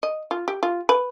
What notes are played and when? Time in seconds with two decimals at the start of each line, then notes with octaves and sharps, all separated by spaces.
0.03 D#5
0.31 F4
0.48 G4
0.63 F4
0.89 B4